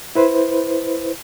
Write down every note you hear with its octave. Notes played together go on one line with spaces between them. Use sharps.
E4 B4 C5